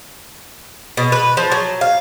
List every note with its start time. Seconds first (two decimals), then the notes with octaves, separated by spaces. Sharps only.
0.97 B2
1.12 B4
1.37 F3
1.52 F#3
1.81 F5